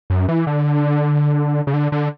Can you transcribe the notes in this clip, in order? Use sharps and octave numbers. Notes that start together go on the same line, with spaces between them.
F#2
E3
D3
C#3
D3
D3